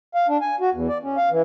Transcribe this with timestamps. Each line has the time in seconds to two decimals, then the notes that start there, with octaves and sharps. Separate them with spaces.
0.14 F5
0.28 D4
0.41 G#5
0.60 F#4
0.74 E2
0.88 D5
1.03 C#4
1.17 F5
1.31 E3